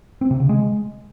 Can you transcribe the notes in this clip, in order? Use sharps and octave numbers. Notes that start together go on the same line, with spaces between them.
C4
C3
C#3
G#3